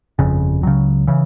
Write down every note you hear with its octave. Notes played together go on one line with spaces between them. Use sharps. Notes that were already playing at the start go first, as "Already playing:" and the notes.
G1 F2 C#3
C#2 C#3 F#3
C#3 E3